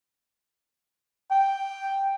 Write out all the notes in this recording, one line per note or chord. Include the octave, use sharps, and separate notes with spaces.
G5